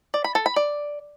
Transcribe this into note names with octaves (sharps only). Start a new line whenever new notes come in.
D5
B5
A4
B5
D5